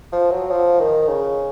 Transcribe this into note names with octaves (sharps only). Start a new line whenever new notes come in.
F3
F#3
F3
D#3
C#3